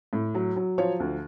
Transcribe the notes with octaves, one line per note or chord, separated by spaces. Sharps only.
A2
F#3
F#3
F3 C#5
D2